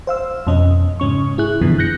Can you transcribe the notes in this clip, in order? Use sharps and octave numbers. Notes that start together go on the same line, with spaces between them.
C5 F5 E6
F2 B2 C#4 D#5
G#2 C#3 C#4 C#6
E4 G#4 F#6
F#2 B2 D3 E3 F3 B3
F#6 G6 A#6 C#7